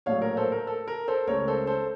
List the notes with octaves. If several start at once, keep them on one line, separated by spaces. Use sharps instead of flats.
A#1 A2 F#3 A3 C#5 F5
A#4 C#5
A4 C5
A#4
A4
A#4
A4 C5
C#2 C#3 A3 A#4 C#5
A4 C5
A4 C5